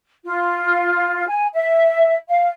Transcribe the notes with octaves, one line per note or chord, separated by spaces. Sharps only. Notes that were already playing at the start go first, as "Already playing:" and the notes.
F4
G#5
E5
F5